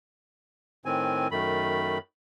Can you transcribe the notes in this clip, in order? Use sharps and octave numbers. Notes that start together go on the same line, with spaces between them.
A2 D#3 C4 G#5
F#2 D#3 A3 B5